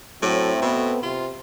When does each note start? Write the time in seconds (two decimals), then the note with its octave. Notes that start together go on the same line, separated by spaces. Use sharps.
0.22 A2 F#3 A3 C4
0.62 B2 B3
1.03 C3 F4